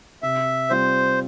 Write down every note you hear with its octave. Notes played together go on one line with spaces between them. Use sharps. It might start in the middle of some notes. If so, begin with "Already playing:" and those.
C3 E5
G3 C4 F4 C5